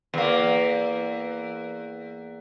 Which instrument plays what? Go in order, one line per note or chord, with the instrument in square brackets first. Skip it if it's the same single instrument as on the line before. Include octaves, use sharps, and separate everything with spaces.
[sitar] E2 A#3